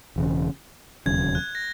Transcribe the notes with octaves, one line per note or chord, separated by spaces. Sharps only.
E1 E2 C#3
E1 D#2 C#3 F#3 G#6
F#6
A#6